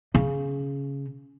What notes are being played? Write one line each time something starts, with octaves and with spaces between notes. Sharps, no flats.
C#3 C#4